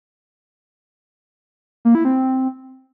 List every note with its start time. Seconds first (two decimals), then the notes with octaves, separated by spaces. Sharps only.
1.85 A#3
1.95 E4
2.05 C4